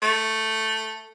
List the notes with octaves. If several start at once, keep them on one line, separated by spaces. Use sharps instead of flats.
A3